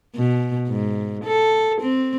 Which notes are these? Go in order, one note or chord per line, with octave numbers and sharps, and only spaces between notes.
B2
G#2
A4
C4